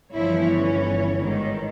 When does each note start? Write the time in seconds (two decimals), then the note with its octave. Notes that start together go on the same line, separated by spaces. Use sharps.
0.14 G1 E3 F3 E4 C#5
0.60 C#4
1.20 G#2 D#3